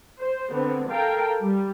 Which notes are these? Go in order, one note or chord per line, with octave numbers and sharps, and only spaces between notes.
C5
D3 B3 C4
A4 A#4 F5 G5
G3